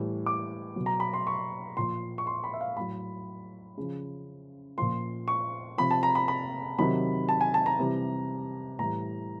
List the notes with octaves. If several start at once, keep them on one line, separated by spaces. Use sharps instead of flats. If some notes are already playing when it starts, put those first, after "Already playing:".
Already playing: A2 E3 G3
D6
B2 F#3
A#5
B5
C6
C#6
A#2 F3 C6
C#6
C6
B5
E5
F5
A2 F#3 B5
C#3 F3
A#2 F3 C6
C#6
C3 F3 B5
A5
A#5
B5
B5
C3 D#3 F#3 B5
A5
G#5
A5
A#5
C3 E3 G3
A2 E3 G3 A#5